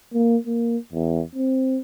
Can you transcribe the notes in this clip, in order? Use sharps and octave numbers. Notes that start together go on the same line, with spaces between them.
A#3
A#3
E2
C4